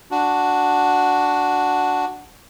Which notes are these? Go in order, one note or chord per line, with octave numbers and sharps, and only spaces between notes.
D4 F#4